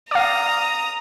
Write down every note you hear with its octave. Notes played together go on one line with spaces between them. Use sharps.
D5 F5 A#5 D#6